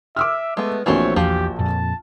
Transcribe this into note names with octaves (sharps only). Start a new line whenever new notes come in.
E5 D6 E6 F6
G#3 A3 B3
A#1 E3 A3 C4 F#4 C#5 G#5
E2 F3 G4
F2 A#2 A5